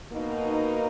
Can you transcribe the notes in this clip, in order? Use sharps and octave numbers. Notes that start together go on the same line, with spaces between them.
B2 A#3 D#4